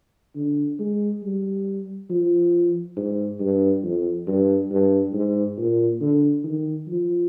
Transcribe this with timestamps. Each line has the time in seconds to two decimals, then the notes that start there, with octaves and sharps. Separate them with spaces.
0.36 D3
0.79 G#3
1.23 G3
2.10 F3
2.97 G#2
3.40 G2
3.84 F2
4.27 G2
4.71 G2
5.14 G#2
5.58 A#2
6.01 D3
6.44 D#3
6.88 F3